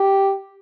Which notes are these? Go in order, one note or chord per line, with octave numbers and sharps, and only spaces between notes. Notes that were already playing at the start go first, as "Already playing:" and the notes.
Already playing: G4